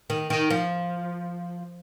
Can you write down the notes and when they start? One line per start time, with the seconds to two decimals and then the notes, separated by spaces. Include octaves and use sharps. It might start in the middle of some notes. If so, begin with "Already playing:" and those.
0.10 D#3
0.30 D#3
0.50 F3